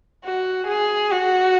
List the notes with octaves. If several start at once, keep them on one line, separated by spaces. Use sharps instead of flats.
F#4
G#4
F#4